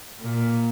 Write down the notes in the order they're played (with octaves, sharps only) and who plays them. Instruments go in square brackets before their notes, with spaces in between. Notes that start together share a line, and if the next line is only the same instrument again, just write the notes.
[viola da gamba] A#2